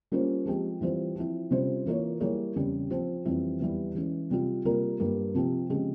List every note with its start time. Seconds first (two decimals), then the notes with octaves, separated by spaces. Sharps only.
0.12 G3 A#3 C#4 F4 C5
0.46 F3 G#3 C4 G4
0.81 E3 G3 C4 F4 C5
1.16 F3 C4 E4
1.50 C3 G3 C#4 F4 C5
1.86 E3 A#3 F4 A#4 C#5
2.20 G3 A#3 E4 G#4 C#5
2.56 E2 C#3 G3 C4 G4
2.90 F3 C4 F4 C5
3.25 F2 E3 G3 C4 E4
3.60 E2 E3 G3
3.95 E3 G#3 C#4
4.30 C3 G3 C4 F4
4.65 C3 G3 A#3 F4 A#4
5.00 G2 G3 A#3
5.34 C3 F3 C4 G4
5.70 C#3 F3 G#3 C4 G4